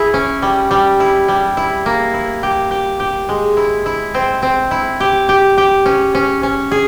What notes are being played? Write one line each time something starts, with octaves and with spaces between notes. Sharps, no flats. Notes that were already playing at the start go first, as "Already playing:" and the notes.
Already playing: E4 G#4
C#4
G3
G3
E4
G3
E4
A#3
E4
G4
G4
G4
G#3
E4
E4
C4
C4
E4
G4
G4
G4
C#4
C#4
C#4
G#4